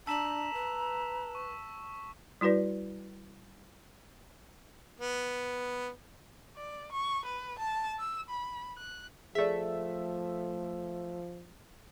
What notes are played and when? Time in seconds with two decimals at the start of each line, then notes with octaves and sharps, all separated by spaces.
0.07 D4 A5 A#5 E6 B6 E7 F#7
0.54 B4
1.35 C#6
2.41 G3 E4 F#4 B4 D5
5.00 B3
6.57 D5
6.92 C#6
7.25 B4
7.59 A5
8.00 E6
8.29 B5
8.77 F#6
9.35 F3 A3 G#4 D5 E5